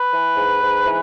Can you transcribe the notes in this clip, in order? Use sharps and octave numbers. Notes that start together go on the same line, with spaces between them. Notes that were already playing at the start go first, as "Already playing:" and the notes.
Already playing: B4
E3
G#2
G#2
E3